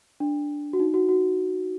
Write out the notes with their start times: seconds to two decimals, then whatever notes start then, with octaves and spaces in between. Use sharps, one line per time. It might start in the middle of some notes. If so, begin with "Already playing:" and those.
0.20 D4
0.73 F#4
0.79 D#4
0.94 F#4
1.09 F#4